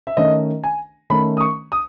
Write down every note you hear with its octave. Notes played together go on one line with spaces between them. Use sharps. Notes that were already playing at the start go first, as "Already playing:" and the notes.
E5
D#3 A3 C#4 D#5
G#5
D#3 A3 C#4 B5
D#6
C#6
D#6